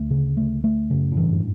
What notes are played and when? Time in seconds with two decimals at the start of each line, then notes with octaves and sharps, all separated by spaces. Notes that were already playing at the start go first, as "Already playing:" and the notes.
Already playing: D2 D3 A3
0.11 C#3
0.37 A3
0.64 A3
0.90 F#2 C#3
1.12 A2
1.17 G2 E3